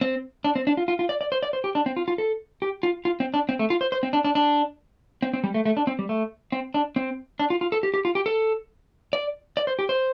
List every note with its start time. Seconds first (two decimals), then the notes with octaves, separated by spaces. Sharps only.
0.01 C4
0.44 D4
0.56 C4
0.67 D4
0.77 F4
0.88 F4
0.99 F4
1.09 D5
1.21 D5
1.32 C5
1.43 D5
1.53 C5
1.64 G4
1.75 D4
1.86 C4
1.97 F4
2.08 F4
2.18 A4
2.62 G4
2.83 F4
3.05 F4
3.20 C4
3.34 D4
3.49 C4
3.59 A3
3.70 F4
3.81 C5
3.92 C5
4.03 C4
4.13 D4
4.25 D4
4.35 D4
5.22 C4
5.34 C4
5.44 G3
5.54 A3
5.65 A3
5.77 D4
5.87 C4
5.99 G3
6.09 A3
6.52 C4
6.74 D4
6.96 C4
7.40 D4
7.50 F4
7.61 F4
7.72 A4
7.83 G4
7.94 G4
8.05 F4
8.15 G4
8.26 A4
9.13 D5
9.57 D5
9.67 C5
9.79 G4
9.89 C5